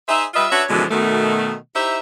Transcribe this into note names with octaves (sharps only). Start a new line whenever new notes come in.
D#4 G#4 C5 E5
G3 F4 B4 D#5 E5
D4 F#4 B4 C#5 E5
F#2 B2 D3 E3 F3 G#3
B2 D#3 A3
D#4 E4 G4 C5 E5